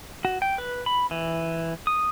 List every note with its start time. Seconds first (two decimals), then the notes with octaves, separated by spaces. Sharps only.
0.25 F#4
0.42 G5
0.58 B4
0.86 B5
1.11 E3
1.87 D#6